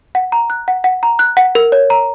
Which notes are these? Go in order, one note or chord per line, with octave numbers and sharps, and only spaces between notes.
F#5
A#5
F#6
F#5
F#5
A#5
F#6
F#5
A#4
C#5
A#5